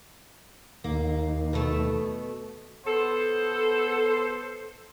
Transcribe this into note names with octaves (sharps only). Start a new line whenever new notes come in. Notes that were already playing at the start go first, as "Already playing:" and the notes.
D#2 A#3
B2 A3
B3 A4 C5